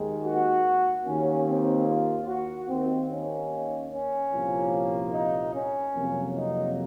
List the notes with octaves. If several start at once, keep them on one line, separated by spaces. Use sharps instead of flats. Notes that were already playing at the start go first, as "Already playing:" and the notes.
Already playing: D#2 D#3 G#3
F#4
D#2 D#3 A#3 C#4
C4
F4
F#4
D#2 D#3 A#3 C4
C#4
C#4
C2 A#2 F3 A#3
D#4
C#4
F2 C3 F#3 A#3
D#4